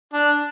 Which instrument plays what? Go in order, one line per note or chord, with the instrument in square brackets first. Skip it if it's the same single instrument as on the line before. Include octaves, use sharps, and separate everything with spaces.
[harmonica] D4